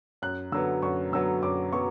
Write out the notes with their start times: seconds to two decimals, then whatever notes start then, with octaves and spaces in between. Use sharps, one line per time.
0.22 F#2 F#6
0.52 D3 F#3 B3 E6
0.82 F#2 C#6
1.12 D3 F#3 B3 E6
1.43 F#2 D6
1.73 F#3 B3 C#6